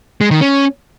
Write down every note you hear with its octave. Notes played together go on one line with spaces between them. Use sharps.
G#3
D#3
C#4